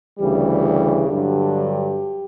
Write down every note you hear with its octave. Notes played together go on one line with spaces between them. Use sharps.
D2 C#3 E3 G3 G4
G4
G2 D3 F#3